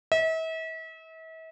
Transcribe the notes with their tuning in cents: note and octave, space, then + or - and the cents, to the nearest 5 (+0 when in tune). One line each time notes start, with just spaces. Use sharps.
E5 -40